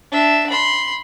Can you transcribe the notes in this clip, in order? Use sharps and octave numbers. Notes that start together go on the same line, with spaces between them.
D4 E5
B5 C6